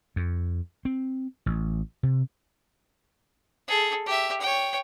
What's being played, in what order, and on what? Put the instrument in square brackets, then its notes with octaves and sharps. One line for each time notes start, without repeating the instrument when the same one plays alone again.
[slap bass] F2
C4
A1
C3
[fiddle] G#4 A4
G4 E5
C#5 G5